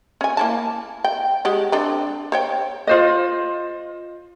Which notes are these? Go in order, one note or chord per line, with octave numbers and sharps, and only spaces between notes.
C#4 G#5
A#3 E4 A5
G5
G#3 G4 F#5
C4 D4 A4
C5 C#5 G5
F4 C5 D#5